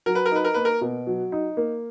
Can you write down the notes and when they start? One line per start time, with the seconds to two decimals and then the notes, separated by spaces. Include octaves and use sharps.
0.06 F#3 A#4
0.15 B4
0.26 A#4
0.31 D#4 B4
0.45 A#4
0.54 A#3 B4
0.65 A#4
0.81 B2
1.07 F#3
1.32 D#4
1.57 A#3